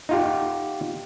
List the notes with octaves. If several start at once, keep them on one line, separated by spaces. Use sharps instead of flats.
D#4 F4 G4